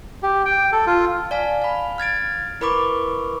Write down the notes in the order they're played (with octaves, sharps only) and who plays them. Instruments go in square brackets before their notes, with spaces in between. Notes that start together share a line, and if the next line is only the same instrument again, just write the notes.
[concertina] G4
G5
A4
F4
[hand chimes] D5 F5 G#5 A5
F5 B5
F6 G#6 A6 D7
E4 A#4 B4 B5 C#6 D6